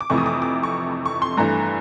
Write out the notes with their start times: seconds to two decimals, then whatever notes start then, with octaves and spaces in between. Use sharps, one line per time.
0.01 D6
0.10 F2 C3 E3 A3 C#6
0.18 D#6
0.26 D6
0.42 D6
0.63 C#6
1.06 C#6
1.22 C6
1.37 G2 E3 A3 A#5